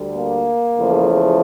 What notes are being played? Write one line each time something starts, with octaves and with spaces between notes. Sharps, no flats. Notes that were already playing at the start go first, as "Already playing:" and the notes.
Already playing: D2 D3 G3
A#3
E2 C#3 F3 A3